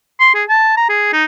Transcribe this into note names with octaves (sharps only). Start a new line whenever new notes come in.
C6
G#4
A5
A#5
G#4
D#4